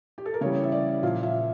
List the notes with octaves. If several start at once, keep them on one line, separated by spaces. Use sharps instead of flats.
G4
A4
A#4
C#3 E3 G3 C#5
E5
D5
A#2 F3 F5
E5